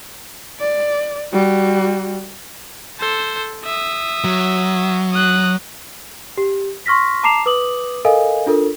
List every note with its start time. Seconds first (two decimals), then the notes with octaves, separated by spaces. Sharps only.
0.60 D5
1.32 G3 F#4
2.99 A4 C5
3.64 E5 D#6
4.24 F#3
5.13 D#6 F#6
6.37 G4
6.86 C6 C#6 F6 A#6 B6
7.23 A5 A#5 D6 C7 E7 F7
7.46 B4 D6 D#6 F#7
8.05 A4 A#4 D#5 F5 G#5
8.46 D4 F4 A4 A#4